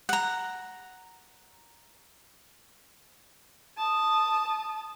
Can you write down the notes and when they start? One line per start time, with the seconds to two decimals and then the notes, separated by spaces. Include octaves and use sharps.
0.09 F#5 A#5
3.77 A5 D#6